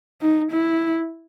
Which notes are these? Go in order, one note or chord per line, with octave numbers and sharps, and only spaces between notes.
D#4
E4